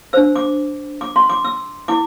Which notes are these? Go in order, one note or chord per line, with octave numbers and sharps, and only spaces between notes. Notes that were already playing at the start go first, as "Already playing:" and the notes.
D4 C5 E6
D6
D6
C6
D6
E6
E4 D6